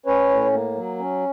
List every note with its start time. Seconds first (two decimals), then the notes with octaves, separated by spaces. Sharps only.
0.06 C#4 B4 C#5
0.30 A2
0.52 A#3
0.75 F#3
0.99 C#4